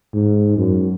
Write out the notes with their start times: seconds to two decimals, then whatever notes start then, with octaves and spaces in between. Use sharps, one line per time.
0.14 G#2
0.57 F#2